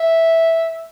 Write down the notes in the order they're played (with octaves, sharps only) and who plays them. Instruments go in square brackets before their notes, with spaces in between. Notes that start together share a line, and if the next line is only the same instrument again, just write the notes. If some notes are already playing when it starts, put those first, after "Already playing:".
Already playing: [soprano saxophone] E5